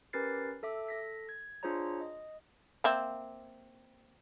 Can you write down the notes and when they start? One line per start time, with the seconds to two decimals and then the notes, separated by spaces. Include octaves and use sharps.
0.13 C#4 G4 A#4 B4 A6 C7
0.63 A4 E5 D6
0.89 A4 A#6 B6
1.29 G#6
1.63 D4 F4 G#4 C5 C#5 A#5
2.01 D#5
2.84 A#3 C4 E5